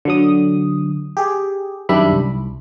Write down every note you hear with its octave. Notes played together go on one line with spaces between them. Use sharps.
D3 F#3 D#6
G4 G#4
F#2 D#3 G3 D4 E5 B5
C2